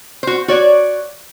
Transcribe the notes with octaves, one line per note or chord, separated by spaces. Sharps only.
F#4 C5
F#4 C#5 D5